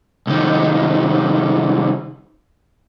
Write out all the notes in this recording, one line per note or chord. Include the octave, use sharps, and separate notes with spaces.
C2 D#3